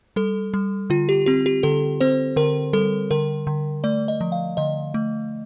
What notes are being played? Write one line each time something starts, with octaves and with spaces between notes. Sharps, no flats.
G3 A4
G3
D3 F4
G4
C4 G4
G4
D3 A4
C4 C5
D3 A#4
G3 A4
D3 A#4
D3
A3 D5
D#5
F3
F5
D3 D#5
A3